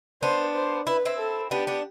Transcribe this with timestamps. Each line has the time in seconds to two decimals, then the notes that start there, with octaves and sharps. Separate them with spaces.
0.22 B3 D4 C5
0.55 C5
0.87 E4 B4
1.05 C4 E4
1.19 A4
1.51 B3 D4 G4
1.67 B3 D4